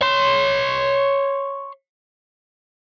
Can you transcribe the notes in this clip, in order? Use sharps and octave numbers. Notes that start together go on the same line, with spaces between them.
C#5 C6